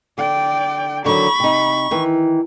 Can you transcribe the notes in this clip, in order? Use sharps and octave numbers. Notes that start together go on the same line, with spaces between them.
D3 D5 G5
D3 D#3 F#3 B5 C#6
C3 D#4
D#3 E3